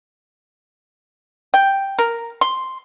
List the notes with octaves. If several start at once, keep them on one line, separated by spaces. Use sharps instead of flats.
G5
A#4
C6